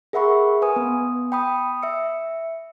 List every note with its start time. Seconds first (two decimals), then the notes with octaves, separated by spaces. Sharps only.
0.13 G#4 A#4 E5 F#5 B5 C#6
0.62 B4 G#5 D#6
0.76 B3
1.32 G5 B5 D#6
1.82 E5 E6 C#7